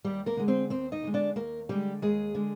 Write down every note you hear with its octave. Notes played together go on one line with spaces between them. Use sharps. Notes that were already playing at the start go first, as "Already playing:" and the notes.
D#2 G3 G4
A#3 A#4
D3 G#3
C4 C5
D#2 C4 C5
D#4 D#5
D3 G#3
D4 D5
D#2 A#3 A#4
D3 G3 G#3 G4
D#2 G#3 G#4
D3 G#3